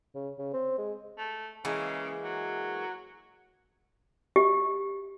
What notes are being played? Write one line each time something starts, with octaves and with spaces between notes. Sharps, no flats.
C#3
C#3
C4
G#3
A3
C#3 E3 G#3 A#3
F#3
G4